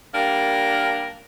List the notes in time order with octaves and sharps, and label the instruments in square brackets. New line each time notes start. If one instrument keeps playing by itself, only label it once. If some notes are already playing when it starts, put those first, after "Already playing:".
[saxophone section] G3 A#3 D4 A#4